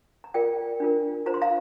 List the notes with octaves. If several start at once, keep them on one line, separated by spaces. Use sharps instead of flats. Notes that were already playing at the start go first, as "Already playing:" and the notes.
A#5
F4 A#4 D5 G5
D4 F4 A#4
F4 C5 A#5
C6
F5 A#5